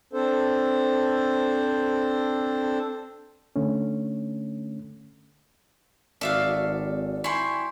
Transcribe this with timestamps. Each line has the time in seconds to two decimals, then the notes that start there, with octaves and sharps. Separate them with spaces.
0.13 C4 D4 A4 C5
3.56 D3 A3 C#4
6.21 G#1 F#4 A4 D5 E5 F5
7.24 E4 G5 G#5 C6 C#6